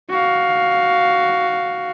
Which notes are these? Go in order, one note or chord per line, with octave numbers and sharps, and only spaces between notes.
F#4 F5